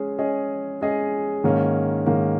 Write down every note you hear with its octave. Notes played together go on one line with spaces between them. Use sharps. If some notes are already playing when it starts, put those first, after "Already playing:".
Already playing: G#3 C#4 G#4
G#3 C#4 G#4 D#5
G#3 C#4 G#4 D#5
G#2 D#3 A#3 C#4
G#2 D#3 A#3 C#4